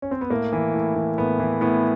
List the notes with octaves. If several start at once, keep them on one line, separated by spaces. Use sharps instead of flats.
C#4
C4
B3
A2 A#3
E3
A2
E3
A2 B3
E3
A2 B3